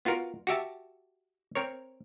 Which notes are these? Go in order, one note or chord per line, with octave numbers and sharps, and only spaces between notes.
B3 F4 F#4 A#4
F#4 G4 E5 A5
C4 A#4 C#5